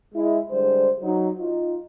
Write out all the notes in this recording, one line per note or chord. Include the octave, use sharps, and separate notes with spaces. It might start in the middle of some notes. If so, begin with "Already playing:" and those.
G#3 E4
D3 G3 G#3 C5
F#3 D#4
D#4 F4